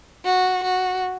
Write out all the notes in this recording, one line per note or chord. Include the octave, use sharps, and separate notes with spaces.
F#4
F#4